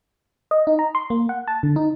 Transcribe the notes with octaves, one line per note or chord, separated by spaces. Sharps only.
D#5
D#4
A#5
C6
A#3
F#5
A5
D3
D#4